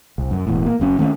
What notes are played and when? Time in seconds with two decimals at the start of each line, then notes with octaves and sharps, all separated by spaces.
0.18 C2
0.31 F#2
0.47 E1 E2 A2
0.66 A#3
0.80 F#1 F#2 C#4
0.99 D#3 A3 A#3 C#4